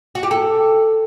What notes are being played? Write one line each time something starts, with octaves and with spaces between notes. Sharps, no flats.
F#4
G4
A4